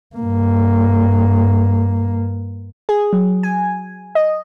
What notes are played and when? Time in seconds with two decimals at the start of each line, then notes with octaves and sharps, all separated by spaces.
0.16 G2 A#3
2.89 G#4
3.13 F#3
3.43 G#5
4.15 D#5